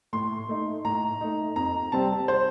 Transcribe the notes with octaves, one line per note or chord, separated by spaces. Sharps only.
A2 C6
A3 D#4
A2 A#5
A3 D#4
F2 A#5
C3 G3 C4 A5
C5